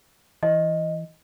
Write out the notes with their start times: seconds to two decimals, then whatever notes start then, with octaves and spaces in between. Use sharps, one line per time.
0.43 E3 D#5